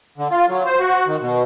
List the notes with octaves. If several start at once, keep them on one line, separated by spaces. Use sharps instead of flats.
D3
F4
F#3
C5
F#4
D#3
B2